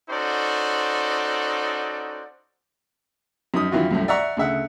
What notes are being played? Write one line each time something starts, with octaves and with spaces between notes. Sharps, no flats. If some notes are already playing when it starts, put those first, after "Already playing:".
C#4 D#4 F#4 A4 C5 D5
F#2 D#4 D#6
F#2 D#3 E3 F4 F#4
C2 F#2 A2
D5 E5 F#5 A#5 C#6
D2 C#3 E5 F#5